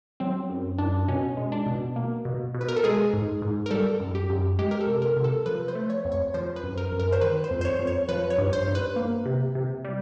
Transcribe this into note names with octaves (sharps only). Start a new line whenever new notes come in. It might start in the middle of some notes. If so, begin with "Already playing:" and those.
F#3 C4
F#2
F#2 D4
B2 C#4
G#3
D4
B2
A#3
B2
B2
B4
A#4
A4
G#3 G#4
G#2
G#2
A#4
G3 A4
F#2
G4
F#2
G#3 G4
A#4
A4
C3
A#4
C3
A4
F3 B4
C5
A3
C#5
F2
C#5
F3 C5
B4
F#2
A#4
F#2
A#4
C5
D#3 B4
C5
F2
C5
C#5
F2
C#5
F3 B4
C#5
G2
C5
G2
B4
A#3
C3
C3
G3